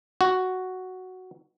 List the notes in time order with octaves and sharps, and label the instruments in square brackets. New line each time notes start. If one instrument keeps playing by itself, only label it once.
[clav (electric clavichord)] F#4